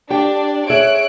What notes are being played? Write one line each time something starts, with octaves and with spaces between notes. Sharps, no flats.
D4 G4 D5 G5
G#4 C#5 E5 F#6 D7